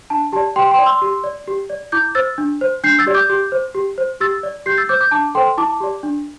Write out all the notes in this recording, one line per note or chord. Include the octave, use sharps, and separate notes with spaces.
D4 A5
G4 D5 A5
G4 G5 C6
G5 C6
D5
C6 E6
G4
D5
G4
D5
E4 D6 G6
C5 E6 A6
D4
C5
D4 G6 C7
E6 A6
G4 D5
D6 G6
G4
C5
G4
C5
G4 E6 A6
D5
G4 G6 C7
E6 A6
C5 D6 G6
D6 G6
D4 A5 D6
A4 C5 G5 C6
E4 A5 D6
G4 D5
D4